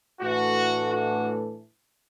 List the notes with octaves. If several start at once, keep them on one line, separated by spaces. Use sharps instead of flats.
A2 E3 A3 D4 F#4
F#4